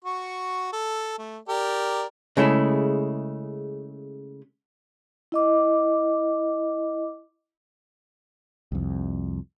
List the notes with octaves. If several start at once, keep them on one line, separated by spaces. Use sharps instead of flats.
F#4 C#6
A4
A3
G4 A#4 D5
C#3 G#3 A3 E4
E4 D#5 D6
C2 F2